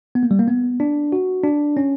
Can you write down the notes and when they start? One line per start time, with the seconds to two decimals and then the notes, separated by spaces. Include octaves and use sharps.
0.15 B3
0.23 A#3
0.31 G3
0.39 A#3
0.48 B3
0.80 D4
1.12 F#4
1.44 D4
1.77 C#4